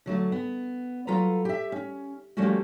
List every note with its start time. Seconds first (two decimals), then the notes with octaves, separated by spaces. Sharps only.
0.06 D3 F#3 A3
0.32 B3
1.07 F#3 F4 A4 B4 A#5
1.45 G4 E5
1.72 C#4
2.37 F3 G3 A3 A#3 C#4 F#4